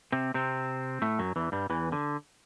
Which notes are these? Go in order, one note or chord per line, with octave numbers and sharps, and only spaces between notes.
C3 C4
C3 C4
A2 A3
F#2 F#3
E2 E3
G2 G3
E2 E3
D3